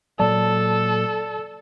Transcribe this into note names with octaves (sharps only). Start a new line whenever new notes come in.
A#2 F#3 A4 D5 A5